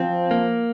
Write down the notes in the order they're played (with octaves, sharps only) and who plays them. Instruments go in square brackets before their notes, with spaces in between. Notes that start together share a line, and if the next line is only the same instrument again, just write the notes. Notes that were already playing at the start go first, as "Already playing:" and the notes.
Already playing: [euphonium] F3 [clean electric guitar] C4
[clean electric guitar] A#3